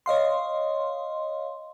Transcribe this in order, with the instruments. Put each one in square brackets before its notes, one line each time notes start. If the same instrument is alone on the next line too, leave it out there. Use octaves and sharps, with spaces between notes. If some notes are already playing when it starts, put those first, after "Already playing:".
[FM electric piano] C#5 D#5 F5 C6